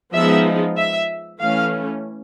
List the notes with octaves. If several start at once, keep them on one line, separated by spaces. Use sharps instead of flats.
F3 G#3 B3 D#4 E5
E5
E3 A3 C#4 F5